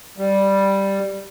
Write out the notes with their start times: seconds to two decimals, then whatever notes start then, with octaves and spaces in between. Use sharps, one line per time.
0.18 G3